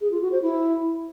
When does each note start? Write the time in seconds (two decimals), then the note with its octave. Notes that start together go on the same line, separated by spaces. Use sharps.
0.01 G#4
0.11 F4
0.22 F#4
0.32 C5
0.42 E4